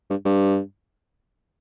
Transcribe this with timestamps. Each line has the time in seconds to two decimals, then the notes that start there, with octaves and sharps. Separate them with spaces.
0.10 G2
0.25 G2